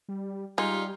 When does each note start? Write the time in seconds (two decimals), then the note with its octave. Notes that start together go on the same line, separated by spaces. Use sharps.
0.09 G3
0.58 G3 G#3 D#4 F4 G4